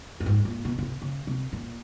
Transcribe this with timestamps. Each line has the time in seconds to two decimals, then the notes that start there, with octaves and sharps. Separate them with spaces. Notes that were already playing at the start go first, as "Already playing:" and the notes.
0.20 G2
0.26 G#2
0.45 A#2
0.65 B2
0.78 C#3
0.83 C3
1.02 C#3
1.27 C3
1.53 A#2